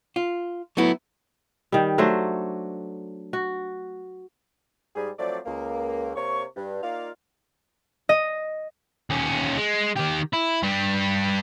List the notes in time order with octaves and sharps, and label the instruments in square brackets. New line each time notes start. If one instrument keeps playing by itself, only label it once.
[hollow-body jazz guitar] F4
F#3 A3 B3 E4
[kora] D#3 G3
F#3 A3 D4 C5
F#4
[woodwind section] G#2 G3 G#4
F3 F#3 A3 C4 D5
C#2 A#3
C3 A#3 C#5 C#6
G2
A#3 D#4 F4 D5 F5
[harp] D#5
[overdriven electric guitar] D#2 C#4
G#3
D#3 G4
E4
G2 G3